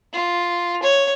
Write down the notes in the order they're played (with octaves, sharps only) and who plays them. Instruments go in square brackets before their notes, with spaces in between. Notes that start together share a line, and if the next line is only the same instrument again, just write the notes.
[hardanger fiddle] F4
C#5